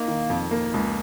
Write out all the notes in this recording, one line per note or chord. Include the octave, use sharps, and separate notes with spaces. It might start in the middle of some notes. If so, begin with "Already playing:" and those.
Already playing: A#3 D#4
D#3
F2
A#3
C#2